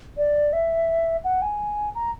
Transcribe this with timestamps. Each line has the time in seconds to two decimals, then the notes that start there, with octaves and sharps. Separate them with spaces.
0.18 D5
0.53 E5
1.24 F#5
1.42 G#5
1.95 A#5